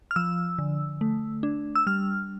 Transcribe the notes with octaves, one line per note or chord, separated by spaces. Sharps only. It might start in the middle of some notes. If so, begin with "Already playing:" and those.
F6
F3 E6
D3
A3
D4
E6
G3 F6